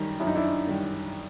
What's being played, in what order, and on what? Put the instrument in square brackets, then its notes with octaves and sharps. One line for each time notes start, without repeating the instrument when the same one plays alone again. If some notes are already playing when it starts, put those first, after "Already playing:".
Already playing: [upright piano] F#2 D#3 G3 [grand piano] D#4
[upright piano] F#2 [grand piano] E4
[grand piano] D#4
D4 E4
[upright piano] D#3 G3